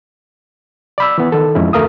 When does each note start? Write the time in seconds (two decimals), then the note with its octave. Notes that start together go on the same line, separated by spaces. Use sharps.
0.98 D5 B5 E6
1.18 E3 B3
1.32 D#3 A4
1.55 F2 G#3 C#4 E4
1.73 D2 A3 A#4 F5 D#6